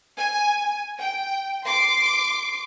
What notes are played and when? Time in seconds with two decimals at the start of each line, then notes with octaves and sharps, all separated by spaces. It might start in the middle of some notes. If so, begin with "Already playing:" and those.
0.17 G#5
1.00 G5
1.65 C6 D6 C7 D7